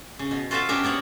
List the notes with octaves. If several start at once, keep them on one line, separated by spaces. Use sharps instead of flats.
C#3
B2
F4 F#4 A4 C5 E5 F5
B2 C#4 D4 G4 A#4 E5
A#3 B3 C#5 F#5